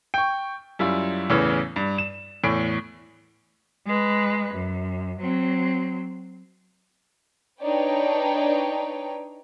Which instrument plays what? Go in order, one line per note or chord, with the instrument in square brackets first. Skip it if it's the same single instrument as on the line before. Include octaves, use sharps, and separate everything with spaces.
[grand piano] G5 C#6
F#2 G3 E4 F4
E2 A2 C#3 E3
G2
E7
E2 A2 D7
[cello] G#3 B4
F#2
F#3 C4
[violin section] D4 D#4 B4 C#5 G5